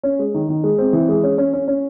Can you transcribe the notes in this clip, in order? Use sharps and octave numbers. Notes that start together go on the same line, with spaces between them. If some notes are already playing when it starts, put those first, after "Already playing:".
C#4
G#3
D#3
D#3
G#3
C4
E3
G#3
C#4
C#4
C#4
C#4